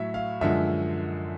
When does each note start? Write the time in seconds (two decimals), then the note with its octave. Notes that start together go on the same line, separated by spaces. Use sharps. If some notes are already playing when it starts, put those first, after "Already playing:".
Already playing: A2 F#3 E5
0.14 F5
0.41 F#2 D3 F3 G#3 E5